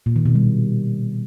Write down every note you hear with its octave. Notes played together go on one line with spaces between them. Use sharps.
A#2
D#3
B2
G3